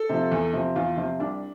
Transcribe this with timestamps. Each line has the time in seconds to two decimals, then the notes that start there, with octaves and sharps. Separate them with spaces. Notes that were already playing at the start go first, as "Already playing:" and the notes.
Already playing: A4
0.09 C3 F3
0.31 E2
0.53 C3 F3
0.76 E2 F4
0.97 C3 F3
1.20 C2 D4